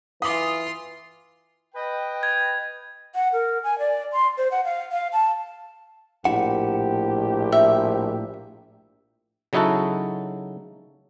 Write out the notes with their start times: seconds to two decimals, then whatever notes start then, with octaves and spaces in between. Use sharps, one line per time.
0.22 E3 F4 F5 C6 D6 D#6
1.75 B4 D#5 G5
2.23 G#6
3.15 F#5
3.33 A#4
3.64 G#5
3.79 D5
4.12 C6
4.37 C5
4.51 F#5
4.64 F5
4.92 F5
5.13 A5
6.25 A#1 A2 E4 G4 F#5
7.52 E5
9.53 C#3 F#3 D#4 E4 F#4 A4